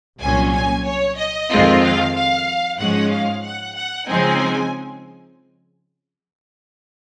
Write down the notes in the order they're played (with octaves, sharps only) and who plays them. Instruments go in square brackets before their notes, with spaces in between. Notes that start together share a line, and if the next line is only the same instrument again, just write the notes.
[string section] C2 A#2 F#3 C#4 G#5
G#5
C#5
D#5
F2 D#3 G#3 C4 F4
F5
F5
G#2 F3 G#3 C#4 F#5
F5
F#5
F#5
C#3 F3 G#3 C4 D#4 G#5